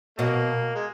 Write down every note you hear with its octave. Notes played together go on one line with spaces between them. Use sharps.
B2 F#3 A#3
G#3